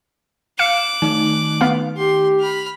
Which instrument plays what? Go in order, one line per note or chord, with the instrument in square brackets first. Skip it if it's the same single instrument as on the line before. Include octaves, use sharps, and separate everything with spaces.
[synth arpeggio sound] F5 C#7 [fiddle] D6 F#6 [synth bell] E7
[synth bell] D#3 A3 D#4
[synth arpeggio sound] B3 F5
[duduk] G4 [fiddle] C6
[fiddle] B5 F6